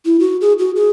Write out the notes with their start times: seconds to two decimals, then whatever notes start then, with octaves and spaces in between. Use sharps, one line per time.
0.05 E4
0.20 F#4
0.41 G#4
0.59 F#4
0.76 G#4